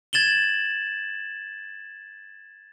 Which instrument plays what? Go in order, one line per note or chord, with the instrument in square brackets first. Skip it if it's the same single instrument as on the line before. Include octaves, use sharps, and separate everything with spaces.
[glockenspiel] G#6 A6 E7 F#7 G7